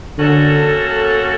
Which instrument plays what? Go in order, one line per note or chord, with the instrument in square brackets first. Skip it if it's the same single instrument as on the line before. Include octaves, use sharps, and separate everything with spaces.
[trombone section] D3 [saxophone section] A#3 C#4 F#4 A4